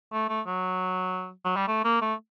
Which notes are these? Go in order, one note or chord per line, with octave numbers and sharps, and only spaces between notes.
A3
A3
F#3
F#3
G3
A3
A#3
A3